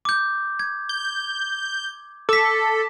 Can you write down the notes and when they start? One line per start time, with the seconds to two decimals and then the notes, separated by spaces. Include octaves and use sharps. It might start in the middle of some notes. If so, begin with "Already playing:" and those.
0.05 D6 G6
0.59 G#6
0.89 G6
2.29 A4 D6 B6